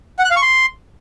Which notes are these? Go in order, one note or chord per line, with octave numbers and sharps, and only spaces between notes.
F#5
F#6
F5
C#6
C6